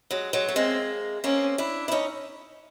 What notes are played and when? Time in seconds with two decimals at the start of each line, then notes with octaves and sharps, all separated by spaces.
0.11 F#3 G#3
0.33 F#3 G#3
0.49 A3
0.55 G#3 A#3 C4
1.24 A#3 C4 C#4
1.58 D4 E4
1.88 E4
1.92 C#4 D#4